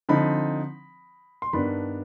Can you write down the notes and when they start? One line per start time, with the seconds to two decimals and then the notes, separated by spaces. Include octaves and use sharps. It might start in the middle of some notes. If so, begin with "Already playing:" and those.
0.09 D3 F3 C4 D#4 B5
1.42 C6
1.53 G2 D#3 B3 D4 B5